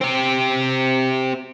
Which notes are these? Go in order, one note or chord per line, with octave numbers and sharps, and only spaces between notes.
C4 G4